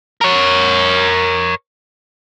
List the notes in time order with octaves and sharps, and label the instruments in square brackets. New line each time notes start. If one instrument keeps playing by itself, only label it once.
[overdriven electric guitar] A#4 C#5